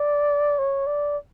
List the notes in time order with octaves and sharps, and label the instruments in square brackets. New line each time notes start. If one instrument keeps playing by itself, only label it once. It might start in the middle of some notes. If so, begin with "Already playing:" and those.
Already playing: [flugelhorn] D5
C#5
D5